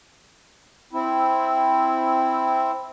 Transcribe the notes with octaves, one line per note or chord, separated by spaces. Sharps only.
C4 E4